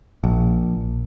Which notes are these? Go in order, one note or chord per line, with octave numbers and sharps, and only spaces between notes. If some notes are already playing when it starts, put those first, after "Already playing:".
A#1